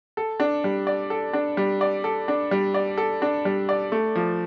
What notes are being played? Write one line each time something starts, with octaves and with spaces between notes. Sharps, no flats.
A4
D4
G3
D5
A4
D4
G3
D5
A4
D4
G3
D5
A4
D4
G3
D5
A3
F3